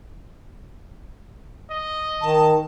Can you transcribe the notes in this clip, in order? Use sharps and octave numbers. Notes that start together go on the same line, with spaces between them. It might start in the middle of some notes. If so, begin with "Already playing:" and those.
D#5
D#3 A5